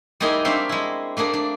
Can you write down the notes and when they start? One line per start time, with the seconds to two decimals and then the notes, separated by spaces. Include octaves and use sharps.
0.20 G3 G#3 A#3 D#4 E4 G#4
0.45 C4 D4 C5 C#5 E5 F5
0.69 G#3 E4
1.17 A3 A#3 D4 G#4
1.33 D4